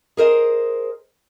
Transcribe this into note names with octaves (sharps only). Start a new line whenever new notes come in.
G#4 A#4 C5 D#5